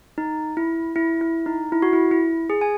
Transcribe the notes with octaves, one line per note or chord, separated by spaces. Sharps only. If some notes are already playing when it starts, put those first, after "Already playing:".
D#4
E4
E4
E4
D#4
E4
F#4
E4
E4
G#4
G#5